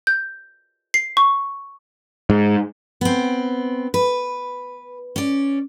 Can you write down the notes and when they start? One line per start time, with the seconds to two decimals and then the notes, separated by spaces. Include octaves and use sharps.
0.07 G6
0.94 C7
1.17 C#6
2.30 G#2
3.01 B3 C4
3.94 B4
5.16 C#4 D5